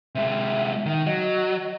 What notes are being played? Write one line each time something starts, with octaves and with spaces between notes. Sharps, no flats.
C3 G#3 E5
D#3
F#3 D#5